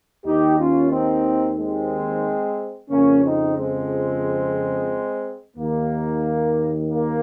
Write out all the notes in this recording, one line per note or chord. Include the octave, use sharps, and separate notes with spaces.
D#2 D#3 D#4 G4
C#4 F4
C4 D#4
G#3 C4
F2 C#3 F3 A#3 C#4
C4 D#4
G#3 C4
D#2 D#3 A#3
A#3